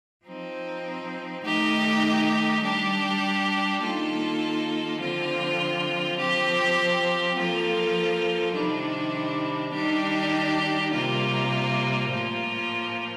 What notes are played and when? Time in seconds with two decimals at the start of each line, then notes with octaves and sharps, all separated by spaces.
0.24 F3 C4 D#4
1.43 D#3 A3 D#4 G4
2.62 G3 D4 G4
3.81 D#3 A#3 F4 A4
5.00 D3 F3 C4 F4
6.18 F3 C4 G4
7.36 F3 A#3 F4 A4
8.55 C3 D#3 G3 D4
9.73 D#3 G3 D4 G4
10.92 C3 G3 A#3 F4
12.11 A2 F3 A#3 F4